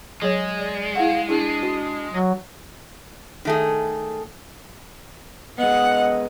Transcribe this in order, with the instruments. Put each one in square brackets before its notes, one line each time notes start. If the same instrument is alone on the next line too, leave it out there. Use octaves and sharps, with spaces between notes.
[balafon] F#3 G#4 C#5 [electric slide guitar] G#3
[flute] D5
[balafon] E4 G#4 F#5 [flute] F5
[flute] D4 [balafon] E4 G#4
[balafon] F#4
[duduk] F#3
[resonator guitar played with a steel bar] D#3 A3 G#4
[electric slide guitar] G#3 B3 [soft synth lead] D#5 [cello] F#5